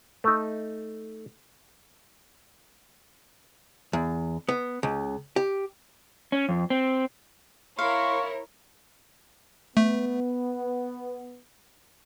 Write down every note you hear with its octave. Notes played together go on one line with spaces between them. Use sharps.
A3 D#4
E2
B3
C#2
G4
C#4
F2
C4
E4 A#4 C#5 F5 C6 C#6
A3 B3